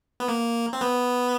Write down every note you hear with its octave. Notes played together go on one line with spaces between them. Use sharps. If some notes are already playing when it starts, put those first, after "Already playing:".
B3
A#3
C4
B3